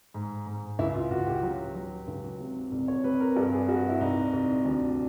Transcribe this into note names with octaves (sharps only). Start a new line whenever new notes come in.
G#2
G#2
C#2 E4
F4
C#2 F#4
G4
F#3
F#3
C#2
C3
C2
C#5
C3 B4
A#4
G2 A4
G#4
G2 F#4
E4
C2 D#4
C2
D2 D4